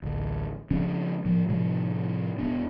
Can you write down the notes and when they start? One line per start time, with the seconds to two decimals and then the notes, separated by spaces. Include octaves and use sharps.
0.02 A1 D2
0.71 C#3 F3 C#4 D4
1.25 A2 F3
1.49 A2 C3 F3 G3
2.39 E1 B3 D4